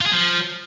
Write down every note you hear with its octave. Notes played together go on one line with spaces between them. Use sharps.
F4
G#4
F3